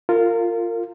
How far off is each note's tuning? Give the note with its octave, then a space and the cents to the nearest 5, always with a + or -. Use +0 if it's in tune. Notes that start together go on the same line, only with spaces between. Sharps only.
F4 +0 A#4 -30